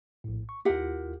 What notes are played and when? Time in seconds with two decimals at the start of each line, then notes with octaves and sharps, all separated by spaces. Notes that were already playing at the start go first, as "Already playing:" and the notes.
0.24 A#1 A2
0.49 C#6
0.65 D#2 E4 F4 G4 A#4 F#5